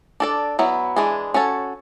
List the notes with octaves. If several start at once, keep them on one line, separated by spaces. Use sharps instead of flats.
D4 A4 D5
F#3 B3 E4
E3 G#3 D4 G#4
C#4 F#4 A4 C#5